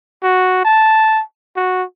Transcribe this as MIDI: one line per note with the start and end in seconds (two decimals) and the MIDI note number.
0.23 0.63 66
0.65 1.22 81
1.56 1.84 66